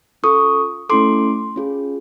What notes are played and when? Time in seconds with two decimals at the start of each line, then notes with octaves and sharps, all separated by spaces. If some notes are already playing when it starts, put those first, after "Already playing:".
0.23 C#4 F4 A4 C#6 D#6
0.89 A3 C#4 E4 A4 C6 D6
1.56 C#4 F4 G#4